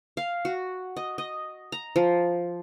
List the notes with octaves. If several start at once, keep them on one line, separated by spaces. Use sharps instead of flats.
F5
F#4
D#5
D#5
A#5
F3